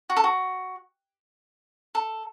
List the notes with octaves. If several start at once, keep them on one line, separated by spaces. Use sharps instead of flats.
F#4
A4
F#4
A4